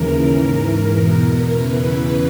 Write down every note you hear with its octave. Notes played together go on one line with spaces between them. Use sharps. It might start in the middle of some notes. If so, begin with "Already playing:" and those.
Already playing: D#2 C#3 E3 A#4
G#2 E3
A#4
E2 B2
A#4
E2 C#3 E3 B4